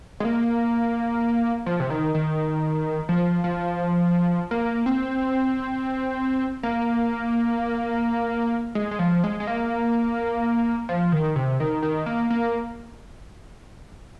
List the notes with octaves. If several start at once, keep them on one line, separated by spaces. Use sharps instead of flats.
G#3
A#3
F3
C3
D#3
D#3
F3
F3
A#3
C4
A#3
G#3
G#3
F3
G#3
G#3
A#3
F3
D#3
C3
D#3
D#3
A#3
A#3